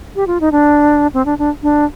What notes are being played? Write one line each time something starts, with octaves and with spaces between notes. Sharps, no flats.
G4
F4
D#4
D4
C4
D4
D4
D4